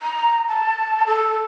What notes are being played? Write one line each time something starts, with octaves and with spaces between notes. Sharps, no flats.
A#5
A5
A4